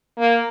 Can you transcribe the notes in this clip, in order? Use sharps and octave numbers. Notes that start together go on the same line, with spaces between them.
A#3